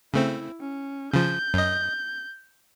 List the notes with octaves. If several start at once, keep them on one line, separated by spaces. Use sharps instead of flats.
C#3 A3 C4 E4
C#4
C#3 F3 G6
F#2 D#5